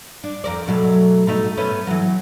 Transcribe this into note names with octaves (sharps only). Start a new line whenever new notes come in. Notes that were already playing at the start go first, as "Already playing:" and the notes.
D4
F2 A#4 D5
B2 F#3 A3
B2 A3 D#4
A3 B3 C#4
E3 F#3